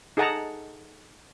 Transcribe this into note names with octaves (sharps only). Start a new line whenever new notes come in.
D#4 G#4 A4 F#5 A5 A#5